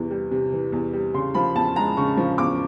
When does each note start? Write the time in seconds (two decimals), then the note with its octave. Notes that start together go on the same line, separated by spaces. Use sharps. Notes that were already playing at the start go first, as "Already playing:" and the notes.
Already playing: E2 C3 E3
0.11 G3
0.31 C3
0.52 E3
0.72 E2
0.93 G3
1.14 C#3 C6
1.34 F3 B5
1.55 E2 A5
1.76 G#3 A#5
1.97 C#3 C#6
2.17 F3
2.38 E2 D6